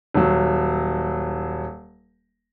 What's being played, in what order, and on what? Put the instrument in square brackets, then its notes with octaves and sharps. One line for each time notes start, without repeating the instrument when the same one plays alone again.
[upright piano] D#1 F#3